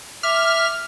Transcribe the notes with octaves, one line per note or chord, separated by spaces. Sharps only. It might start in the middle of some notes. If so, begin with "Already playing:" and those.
E5 D6 F6